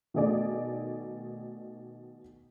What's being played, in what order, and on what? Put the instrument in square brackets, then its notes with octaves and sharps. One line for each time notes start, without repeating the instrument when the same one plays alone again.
[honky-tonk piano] B2 D#3 A3 D#4 G#4 D5